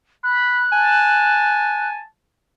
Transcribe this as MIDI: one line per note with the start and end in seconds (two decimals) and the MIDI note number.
0.24 0.68 83
0.24 1.88 90
0.72 2.01 80
0.72 2.08 81